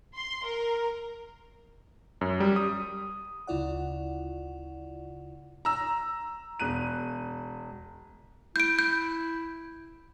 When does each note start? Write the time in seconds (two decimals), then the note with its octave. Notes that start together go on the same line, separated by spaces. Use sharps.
0.14 C6
0.44 A#4
2.21 F#2
2.40 G3
2.56 D#6
3.47 D2 C#3 E4 F4 D5 F#5
5.65 A#5 E6
6.60 E1 F#6 D#7
8.56 E4 G6 D7
8.79 G6